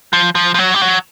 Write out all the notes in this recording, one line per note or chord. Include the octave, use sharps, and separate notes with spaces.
F3
F3
F3
F#3
G3
F#3